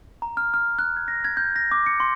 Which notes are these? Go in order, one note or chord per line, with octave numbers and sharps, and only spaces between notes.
A#5
F6
F6
F#6
G#6
A#6
G#6
G6
A#6
D6
C#7
C6